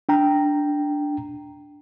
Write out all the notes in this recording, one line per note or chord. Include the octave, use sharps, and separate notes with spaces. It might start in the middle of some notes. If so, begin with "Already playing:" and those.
D4 G5 A#5